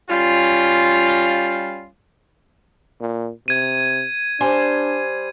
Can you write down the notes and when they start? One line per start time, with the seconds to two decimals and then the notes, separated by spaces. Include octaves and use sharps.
0.10 G3 C#4 F4
3.00 A#2
3.48 C3 G#6 D#7
4.41 G3 D4 C5 G#5